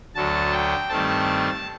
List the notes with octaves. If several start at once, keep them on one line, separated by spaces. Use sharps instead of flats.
D2 D3 F#3 A5
G5
G2 D#3 A3 C4 A5